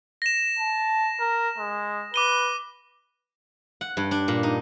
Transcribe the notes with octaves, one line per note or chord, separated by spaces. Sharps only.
A#6 E7
A5
A#4
G#3
B4 D6 D#7 G7
F#5
G2
D4
A#2
D#4